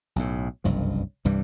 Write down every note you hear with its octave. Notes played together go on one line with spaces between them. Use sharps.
B1 A2
F#1 C2 G2 F3
C2 G2 E3 G3